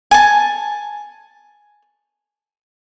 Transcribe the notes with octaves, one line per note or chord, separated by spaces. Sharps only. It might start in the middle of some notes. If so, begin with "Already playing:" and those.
G#5 A5